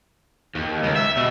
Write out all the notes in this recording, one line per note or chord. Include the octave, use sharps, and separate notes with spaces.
D#2
C#2
E5
B2